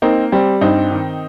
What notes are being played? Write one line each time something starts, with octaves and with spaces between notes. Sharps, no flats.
A#3 C4 D#4
G3 C4
G2 C4 D#4
D#3